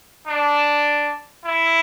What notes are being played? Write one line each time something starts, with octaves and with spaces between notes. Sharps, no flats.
D4
E4